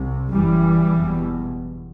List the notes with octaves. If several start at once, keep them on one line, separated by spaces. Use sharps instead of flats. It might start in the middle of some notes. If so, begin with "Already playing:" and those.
Already playing: C2 C3
F#1 F#2 E3 G3
F#1 E2 B2